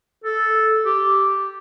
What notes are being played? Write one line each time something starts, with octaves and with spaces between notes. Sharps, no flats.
A4
G4